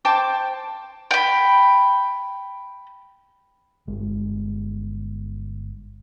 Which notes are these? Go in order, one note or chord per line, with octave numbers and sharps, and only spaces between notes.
C5 G5 A5 D6
G5 B5
G1 G#3